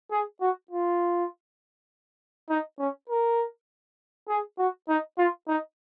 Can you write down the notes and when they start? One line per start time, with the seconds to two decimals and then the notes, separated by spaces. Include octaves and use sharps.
0.12 G#4
0.41 F#4
0.71 F4
2.50 D#4
2.79 C#4
3.09 A#4
4.29 G#4
4.59 F#4
4.89 D#4
5.18 F4
5.48 D#4